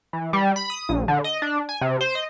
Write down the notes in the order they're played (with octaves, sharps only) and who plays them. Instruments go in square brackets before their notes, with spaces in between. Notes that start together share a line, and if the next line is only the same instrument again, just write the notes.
[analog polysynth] E3
G3
B5
D#6
A#1
D3
D#5
D4
G#5
C3
C5
D#5